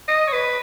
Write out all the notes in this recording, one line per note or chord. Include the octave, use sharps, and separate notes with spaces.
D#5
C#5
B4